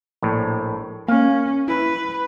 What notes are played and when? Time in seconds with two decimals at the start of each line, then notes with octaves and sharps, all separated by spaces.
0.22 A#1 A2
1.08 A#3 C#4 F5
1.68 E4 B4